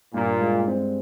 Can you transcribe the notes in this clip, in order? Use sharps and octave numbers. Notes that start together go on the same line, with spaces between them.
G2 A#2
G#3
C4